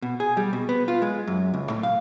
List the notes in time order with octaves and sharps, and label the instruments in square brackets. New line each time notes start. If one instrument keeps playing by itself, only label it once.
[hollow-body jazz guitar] B2
G#4
G3
B2
B3
F4
G#3
F#2
C#2
A2
F5